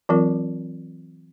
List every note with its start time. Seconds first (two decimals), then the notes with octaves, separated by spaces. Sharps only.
0.09 E3 F#3 C4 F4 A#4